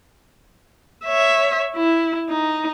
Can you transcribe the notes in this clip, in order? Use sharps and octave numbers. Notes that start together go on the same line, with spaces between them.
C#5 E5
E4
D#4